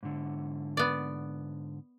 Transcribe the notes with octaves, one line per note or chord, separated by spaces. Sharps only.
G#2 D3
B3 D5